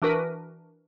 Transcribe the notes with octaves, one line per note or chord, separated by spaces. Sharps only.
E3 D4 F#4 A#4 B4